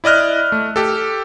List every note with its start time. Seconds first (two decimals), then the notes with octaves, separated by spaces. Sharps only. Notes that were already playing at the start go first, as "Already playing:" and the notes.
0.04 E4 D5 D#5 F6 F#6
0.52 A3
0.76 G4 A4